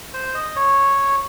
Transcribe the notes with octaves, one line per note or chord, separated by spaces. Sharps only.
C5
D#5
C#5